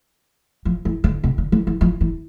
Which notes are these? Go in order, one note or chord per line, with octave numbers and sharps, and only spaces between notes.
F3
E3
D3
C3
D3
E3
E3
F3
E3